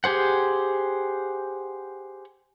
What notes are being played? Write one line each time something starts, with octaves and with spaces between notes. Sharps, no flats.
G4 G#4 C5 F#5